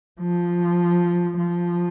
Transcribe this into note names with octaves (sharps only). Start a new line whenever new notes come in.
F3
F3